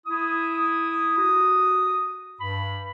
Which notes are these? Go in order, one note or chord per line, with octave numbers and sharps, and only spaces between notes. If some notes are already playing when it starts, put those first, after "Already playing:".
E4 D#6
F#4
G2 B5